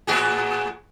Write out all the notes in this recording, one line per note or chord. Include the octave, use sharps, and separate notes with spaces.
A2 F#4 G#4